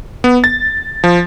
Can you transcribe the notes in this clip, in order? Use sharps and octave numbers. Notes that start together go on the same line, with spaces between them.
B3
A6
F3